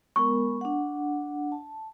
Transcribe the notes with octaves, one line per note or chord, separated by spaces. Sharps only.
G#3 B3 A#4 C#6
D4 F#5
A5